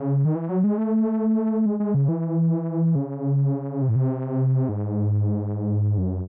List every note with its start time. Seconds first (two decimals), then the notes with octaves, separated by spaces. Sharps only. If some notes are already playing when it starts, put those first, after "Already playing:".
Already playing: C#3
0.25 D#3
0.35 E3
0.49 F#3
0.64 G#3
0.78 A3
1.66 G#3
1.80 G#3
1.94 C#3
2.08 E3
2.95 C#3
3.82 C3
3.89 A2
3.95 C3
4.69 G#2
5.98 F#2